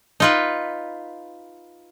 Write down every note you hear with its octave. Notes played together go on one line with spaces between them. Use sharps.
D#4 F4 B4